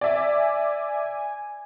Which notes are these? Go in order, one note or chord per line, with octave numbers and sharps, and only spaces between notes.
D5 E5 G#5